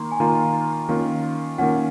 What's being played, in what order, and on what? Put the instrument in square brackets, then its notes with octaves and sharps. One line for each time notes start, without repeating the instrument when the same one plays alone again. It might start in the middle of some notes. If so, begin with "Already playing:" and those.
Already playing: [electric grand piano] D#3 A#3 [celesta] A#5 C6
[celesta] G#5
[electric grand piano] D#3 A#3 F4 [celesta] A#5
[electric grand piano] D#3 A#3 C#4 F4
[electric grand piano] D#3 A#3 C#4 F4 [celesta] F#5